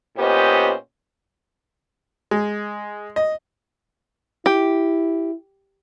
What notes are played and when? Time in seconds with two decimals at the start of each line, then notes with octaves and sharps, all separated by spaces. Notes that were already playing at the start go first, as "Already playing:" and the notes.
0.17 A#2 B3 C#4 G4 C5 D#5
2.31 G#3
3.16 D#5
4.46 E4 G4